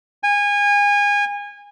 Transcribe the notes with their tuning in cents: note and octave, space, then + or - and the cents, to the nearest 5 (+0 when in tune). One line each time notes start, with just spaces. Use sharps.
G#5 -25